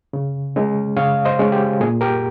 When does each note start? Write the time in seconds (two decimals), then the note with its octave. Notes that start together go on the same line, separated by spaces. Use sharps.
0.13 C#3
0.56 G#3 C#4
0.97 C#3 C#5 F5
1.25 C5 D#5
1.39 G#3 C#4
1.52 G4
1.80 A#2 G#4
2.01 G4 A#4